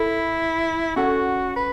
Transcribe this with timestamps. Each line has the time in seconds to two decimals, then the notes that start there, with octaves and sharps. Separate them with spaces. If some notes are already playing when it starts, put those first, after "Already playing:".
Already playing: E4 A4 B5
0.96 C#4 F#4 A4 F#5
1.56 B4